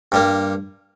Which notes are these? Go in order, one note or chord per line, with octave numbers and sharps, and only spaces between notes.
G2 G3 A#3